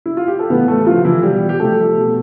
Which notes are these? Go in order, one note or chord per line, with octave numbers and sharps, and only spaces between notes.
E4
F4
G4
A4
A2 E3 B3 B4
A3 A4
C3 E3 F3 F4
E3 E4
B2 G3 G4
G4
C3 F3 A3 A4
B2